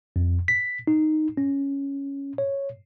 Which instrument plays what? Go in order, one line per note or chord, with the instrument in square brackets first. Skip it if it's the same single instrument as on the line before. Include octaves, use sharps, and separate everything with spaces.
[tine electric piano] F2
B6
D#4
C#4
C#5